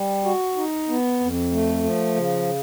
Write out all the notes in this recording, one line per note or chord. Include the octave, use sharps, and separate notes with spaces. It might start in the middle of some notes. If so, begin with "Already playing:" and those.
Already playing: G3
F#4
D#4
B3
F2
A3
F3
C#3